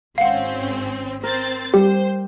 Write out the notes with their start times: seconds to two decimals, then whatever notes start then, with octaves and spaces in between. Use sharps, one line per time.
0.18 G#1 C4 C#4 F5 F#5
1.23 C4 A#4 C5 A6
1.74 G3 G4 C5